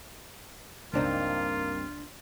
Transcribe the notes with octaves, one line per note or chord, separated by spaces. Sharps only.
C#2 G2 A#3 C4 D4 D#4 F4